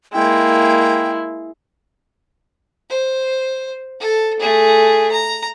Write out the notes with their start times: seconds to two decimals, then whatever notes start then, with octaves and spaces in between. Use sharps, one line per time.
0.13 G#3 A#3 E4 G5
2.90 C5
4.00 A4
4.40 A3 G#4
5.12 A#5